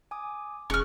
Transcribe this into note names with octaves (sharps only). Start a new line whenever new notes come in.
G#5 D6 D#6
E1 C#4 G#4 C#6 F6 F#6